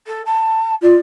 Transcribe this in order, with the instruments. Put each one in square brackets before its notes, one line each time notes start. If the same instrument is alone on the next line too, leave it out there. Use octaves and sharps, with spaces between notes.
[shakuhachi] A4
A5
[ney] F4 [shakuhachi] D5